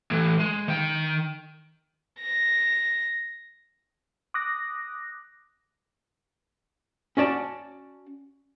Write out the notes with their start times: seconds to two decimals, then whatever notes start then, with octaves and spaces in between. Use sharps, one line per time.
0.11 A2 E3
0.40 G#3
0.68 D#3 G5
2.21 A#6
4.34 D6 D#6 F#6 A#6
7.17 C#4 F#4 D5 A5